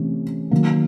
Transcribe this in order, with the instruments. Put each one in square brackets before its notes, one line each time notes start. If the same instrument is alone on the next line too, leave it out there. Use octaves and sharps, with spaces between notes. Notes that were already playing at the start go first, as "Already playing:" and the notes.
Already playing: [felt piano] C3 E3 A3 C#4
D#3 F#3 A#3